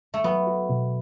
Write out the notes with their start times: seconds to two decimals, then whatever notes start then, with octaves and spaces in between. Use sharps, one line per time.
0.14 A3
0.24 F#3 B3
0.47 F#4
0.70 B2